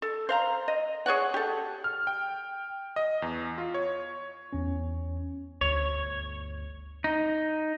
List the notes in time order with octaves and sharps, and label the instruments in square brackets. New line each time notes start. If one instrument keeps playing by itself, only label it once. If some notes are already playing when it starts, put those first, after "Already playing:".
[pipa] A4
C5 F5 A#5
D#5
G#4 C#5 D5 F#5
G4 A4
[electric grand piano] F6
G5
D#5
E2
F4
C#5
[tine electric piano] E2 C#4
[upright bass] G1 D2 [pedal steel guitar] C#5
[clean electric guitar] D#4